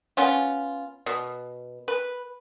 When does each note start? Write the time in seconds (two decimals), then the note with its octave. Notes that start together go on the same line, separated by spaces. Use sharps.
0.17 B3 C#4 F4
1.06 B2
1.88 B4